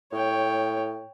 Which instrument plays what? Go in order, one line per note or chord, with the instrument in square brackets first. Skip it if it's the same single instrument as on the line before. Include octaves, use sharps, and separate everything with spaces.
[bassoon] A2 [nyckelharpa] C#5 G5